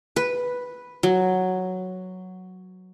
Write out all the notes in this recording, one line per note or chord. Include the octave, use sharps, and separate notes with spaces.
B4
F#3